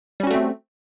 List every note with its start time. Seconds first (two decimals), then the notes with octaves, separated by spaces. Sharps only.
0.20 G3
0.23 C#4
0.27 F#4
0.31 A3
0.34 C4